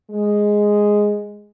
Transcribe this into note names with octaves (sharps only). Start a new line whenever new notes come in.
G#3